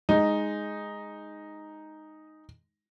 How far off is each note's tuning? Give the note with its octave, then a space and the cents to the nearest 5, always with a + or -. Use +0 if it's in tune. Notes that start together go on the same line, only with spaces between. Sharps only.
G#3 +0 D#4 +0